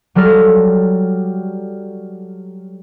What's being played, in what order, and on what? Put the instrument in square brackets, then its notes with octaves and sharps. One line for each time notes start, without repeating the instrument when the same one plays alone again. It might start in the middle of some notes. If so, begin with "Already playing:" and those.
[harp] F#3 G3 A4 F6 A#6